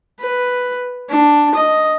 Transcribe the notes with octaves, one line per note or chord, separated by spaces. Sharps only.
B4
D4
D#5